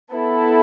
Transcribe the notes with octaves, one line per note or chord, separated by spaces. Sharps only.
B3 E4 A4